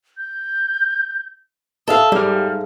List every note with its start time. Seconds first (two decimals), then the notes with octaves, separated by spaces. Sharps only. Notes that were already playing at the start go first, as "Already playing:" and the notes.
0.17 G6
1.87 A4 E5 F5 D#6
2.12 G#2 G3 D6 F6
2.34 F5